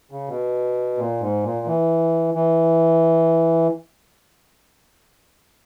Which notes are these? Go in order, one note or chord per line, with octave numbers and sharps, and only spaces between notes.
C#3
B2
A#2
G#2
A#2
E3
E3